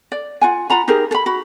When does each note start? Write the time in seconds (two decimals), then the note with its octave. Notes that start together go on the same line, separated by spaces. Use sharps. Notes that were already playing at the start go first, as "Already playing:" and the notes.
0.12 D5
0.41 F4 F#5 G#5
0.70 F4 F#5 A#5 B5
0.88 D#4 G4 G#4 A#4
1.11 A4 B5
1.26 F#4 B5